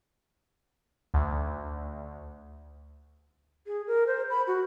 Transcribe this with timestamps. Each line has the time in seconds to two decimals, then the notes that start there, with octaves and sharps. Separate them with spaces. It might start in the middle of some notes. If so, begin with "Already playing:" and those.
1.14 D2
3.66 G#4
3.87 A#4
4.07 C5
4.30 B5
4.47 F#4